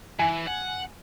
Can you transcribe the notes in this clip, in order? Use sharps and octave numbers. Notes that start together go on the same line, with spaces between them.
E3 G#5
F#5